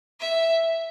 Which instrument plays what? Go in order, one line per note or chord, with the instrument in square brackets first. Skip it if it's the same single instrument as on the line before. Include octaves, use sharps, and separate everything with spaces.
[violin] E5